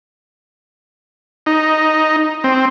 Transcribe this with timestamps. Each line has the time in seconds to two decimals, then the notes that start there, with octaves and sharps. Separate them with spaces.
1.46 D#4
2.44 C4